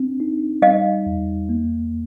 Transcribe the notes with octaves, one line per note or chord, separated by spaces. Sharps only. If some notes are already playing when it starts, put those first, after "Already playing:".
Already playing: C4 D4
D#4
G3 D#5 F5
E2
A#3